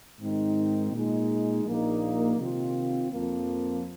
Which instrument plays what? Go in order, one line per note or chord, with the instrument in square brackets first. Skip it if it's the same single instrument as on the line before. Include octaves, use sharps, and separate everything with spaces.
[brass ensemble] G#2 D#3 C4 D#4
A#2 G#3 D#4
A#1 A#2 A#3 D#4
C3 D#3 C4 F4
F2 F3 A#3